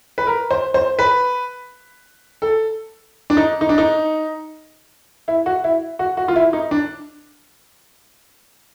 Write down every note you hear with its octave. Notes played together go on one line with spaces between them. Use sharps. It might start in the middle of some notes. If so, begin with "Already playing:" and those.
B4
A#4
C5
C5
B4
A4
D4
D#4
D#4
D4
D#4
E4
F#4
E4
F#4
F#4
F4
E4
D#4
D4